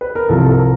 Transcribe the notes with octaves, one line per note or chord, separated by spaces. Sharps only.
B4
A#4
C2 C3 F3 A4
A4
A#4